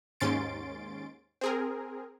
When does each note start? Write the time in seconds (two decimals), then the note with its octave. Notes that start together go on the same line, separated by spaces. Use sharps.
0.20 D#2 G#2 C#4 C6 A6 D7
1.41 C4 G#4 A#4